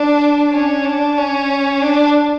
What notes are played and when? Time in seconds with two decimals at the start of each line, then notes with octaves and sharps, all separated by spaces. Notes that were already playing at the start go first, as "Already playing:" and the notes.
Already playing: D4
0.53 C#4
0.85 D4
1.18 C#4
1.82 D4